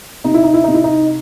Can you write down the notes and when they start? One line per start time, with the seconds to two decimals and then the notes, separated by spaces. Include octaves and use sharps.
0.24 C3 D#4
0.34 E4
0.43 D#4
0.54 E4
0.64 C3 D#4
0.74 E4
0.84 D#4